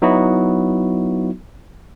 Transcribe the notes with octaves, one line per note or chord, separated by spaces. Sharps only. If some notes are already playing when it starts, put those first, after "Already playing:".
F#3 B3 D#4 E4 F#4